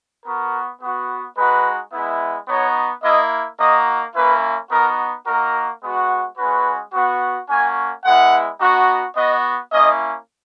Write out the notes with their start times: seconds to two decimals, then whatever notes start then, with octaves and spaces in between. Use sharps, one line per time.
0.25 B3 F#4 A#4
0.81 B3 F#4
1.36 G#3 D#4 F#4 B4
1.93 G#3 B3 E4
2.48 B3 D#4 F#4 C#5
3.03 A#3 E4 D#5
3.59 A#3 D#4 F#4 D#5
4.15 A#3 C#4 E4 B4
4.70 B3 D#4 F#4 A#4
5.26 A#3 D#4 F#4 A#4
5.83 G#3 B3 F#4
6.38 G#3 C#4 F#4 B4
6.93 B3 F#4
7.49 A#3 C#4 F#4 G#5
8.04 G#3 B3 E4 F#5
8.60 B3 D#4 F#4
9.16 B3 F#4 D#5
9.72 A#3 C#4 E4 D#5